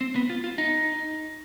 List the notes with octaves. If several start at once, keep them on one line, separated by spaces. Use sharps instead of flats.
C4
B3
F4
F4
D#4